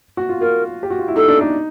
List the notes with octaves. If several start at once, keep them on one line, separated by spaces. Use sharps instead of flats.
F#4
F4
F4 A#4
G4
F#4
F4
E4
D#4 A4
D4
D#4